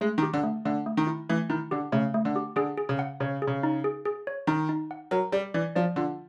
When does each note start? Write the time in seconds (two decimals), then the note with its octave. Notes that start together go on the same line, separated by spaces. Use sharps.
0.01 G#3 A3
0.18 D#3
0.23 G4
0.34 D3
0.44 A3
0.65 D3 A3
0.86 A3
0.97 D#3
1.07 E4
1.29 E3 A3
1.50 D#3 E4
1.71 D3 G4
1.92 C#3 A3
2.14 A3
2.25 D3
2.36 G4
2.56 D3 G#4
2.78 G#4
2.89 C#3
2.99 F#5
3.20 C#3 C#5
3.42 G#4
3.47 C#3
3.63 D#4
3.84 G#4
4.05 G#4
4.27 C#5
4.47 D#3 D#4
4.69 D#4
4.91 F#5
5.11 F#3 A#4
5.32 G3 D5
5.54 E3 D5
5.75 F3 D5
5.96 D3 F4